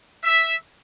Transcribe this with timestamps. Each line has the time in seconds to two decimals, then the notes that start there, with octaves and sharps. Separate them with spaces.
0.23 E5